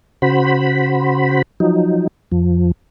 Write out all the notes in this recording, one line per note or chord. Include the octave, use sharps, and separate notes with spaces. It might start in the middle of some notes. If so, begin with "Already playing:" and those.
C#3 F#4 C5 B5
F3 F#3 D#4
F2 F3